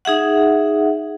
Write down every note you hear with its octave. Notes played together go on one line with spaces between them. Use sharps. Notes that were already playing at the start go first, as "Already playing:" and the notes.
D#4 G#4 E5 F#5